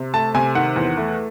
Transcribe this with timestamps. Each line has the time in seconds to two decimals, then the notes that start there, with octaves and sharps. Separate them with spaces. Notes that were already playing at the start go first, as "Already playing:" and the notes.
Already playing: C3
0.14 A3 A5
0.34 C3 G#5
0.55 D#3 F#5
0.76 E2
0.97 A3